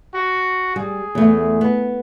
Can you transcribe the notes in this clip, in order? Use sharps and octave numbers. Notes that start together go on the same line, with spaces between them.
F#4
G3 G#4
E2 A3
B3